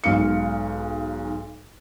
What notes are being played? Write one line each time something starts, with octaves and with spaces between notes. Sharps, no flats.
B1 G#2 F5 C#7